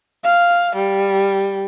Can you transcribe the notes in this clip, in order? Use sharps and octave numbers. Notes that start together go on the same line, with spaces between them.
F5
G3